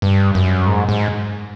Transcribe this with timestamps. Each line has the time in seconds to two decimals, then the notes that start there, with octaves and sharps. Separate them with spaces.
0.02 G2
0.35 F#2
0.67 G#2
0.89 G#2